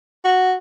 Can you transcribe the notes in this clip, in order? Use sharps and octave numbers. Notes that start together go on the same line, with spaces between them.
F#4